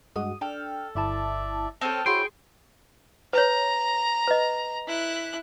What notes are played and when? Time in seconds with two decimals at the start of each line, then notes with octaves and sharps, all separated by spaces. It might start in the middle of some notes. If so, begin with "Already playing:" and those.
0.16 G2 G#3 F#4 D#6
0.41 D4 A4 G5 F6
0.95 G1 E4 D5 E5 A5
1.81 C4 C#4 A4 G5 A5 F6
2.06 E4 F#4 G#4 C5 C#5 G5 C6 C7
3.33 B4 C#5 A#5
4.28 B4 D#5
4.87 E4 F#6